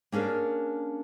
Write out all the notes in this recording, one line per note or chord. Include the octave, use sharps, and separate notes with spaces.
A#3 C#4 D4 G#4 A#4